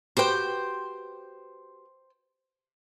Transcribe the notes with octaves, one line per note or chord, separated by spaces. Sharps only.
F#4 G4 B4 C5 G5